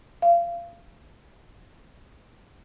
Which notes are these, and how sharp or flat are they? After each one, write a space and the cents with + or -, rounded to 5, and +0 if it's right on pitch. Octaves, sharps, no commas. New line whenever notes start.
F5 -30